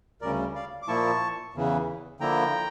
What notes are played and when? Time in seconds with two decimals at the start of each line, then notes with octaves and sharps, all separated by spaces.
0.21 D2 C#3 G3 C#4 A#4 D5
0.55 D5 F5
0.82 D6
0.88 A#2 F3 A#3 E4 A5 C#6
1.54 E2 C#3 E3
2.20 D3 F3 A#3 E4 G5 A#5